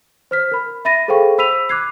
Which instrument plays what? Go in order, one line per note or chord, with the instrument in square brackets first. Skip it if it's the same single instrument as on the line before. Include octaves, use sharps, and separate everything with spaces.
[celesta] C5 F6 B6
A#4 B5
E5 B5 A6 A#6 D#7
G#4 A4 C5 F5 G5 C#6
C5 B5 E6 B6 D#7 F7
D6 F#6 G#6 C7